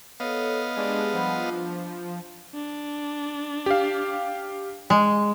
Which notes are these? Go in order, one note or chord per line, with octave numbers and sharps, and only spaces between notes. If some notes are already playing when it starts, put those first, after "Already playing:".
B3 A4 C#5 D#5 F5
G#3 D4 G4 G#4
F3 G3 F#5 B5
D4
D4
G4 F5
G#3